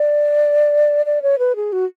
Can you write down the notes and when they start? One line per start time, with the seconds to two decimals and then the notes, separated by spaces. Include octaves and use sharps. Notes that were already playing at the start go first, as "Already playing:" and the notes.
Already playing: D5
1.06 D5
1.22 C#5
1.39 B4
1.56 G#4
1.72 F#4